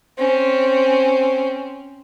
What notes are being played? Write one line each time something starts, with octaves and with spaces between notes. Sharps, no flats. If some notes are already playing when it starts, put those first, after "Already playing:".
C4 C#4